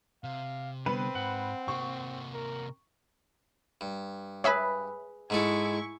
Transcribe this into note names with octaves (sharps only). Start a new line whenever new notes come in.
C3 F5
D3 G3 B3 C4 B4
G#2 F#5
C3 A#3 C#6
A#4
G2
G#4 B4 C#5 E5 B5
G#2 G#3 E4 A4 G#5 C#6